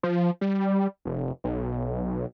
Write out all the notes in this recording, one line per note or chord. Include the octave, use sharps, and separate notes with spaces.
F3
G3
F1
B1